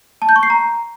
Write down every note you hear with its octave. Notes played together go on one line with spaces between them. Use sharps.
A5
G6
C#6
C7
A#5